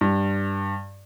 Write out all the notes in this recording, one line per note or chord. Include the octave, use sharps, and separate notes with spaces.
G2